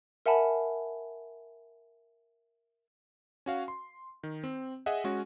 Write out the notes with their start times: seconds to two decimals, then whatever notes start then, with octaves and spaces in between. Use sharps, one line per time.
0.26 A#4 E5 F#5 G#5 A5 B5
3.46 C#4 F#4 F5
3.68 C6
4.23 D#3
4.44 C4
4.86 G#4 D#5 E5 F#5
5.04 G#3 C#4 F#4